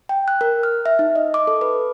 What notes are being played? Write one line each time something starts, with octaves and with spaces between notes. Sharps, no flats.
G5
F#6
A#4
F6
E5
D#4
D#5
D6
A4
B4